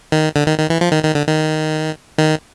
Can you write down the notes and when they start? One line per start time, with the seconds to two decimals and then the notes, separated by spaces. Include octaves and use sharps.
0.12 D#3
0.36 D3
0.47 D#3
0.58 D#3
0.70 E3
0.81 F3
0.92 D#3
1.04 D#3
1.15 D3
1.27 D#3
2.18 D#3